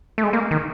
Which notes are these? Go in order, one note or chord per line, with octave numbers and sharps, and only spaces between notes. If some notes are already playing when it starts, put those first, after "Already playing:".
A3
G#3
A#3
D#3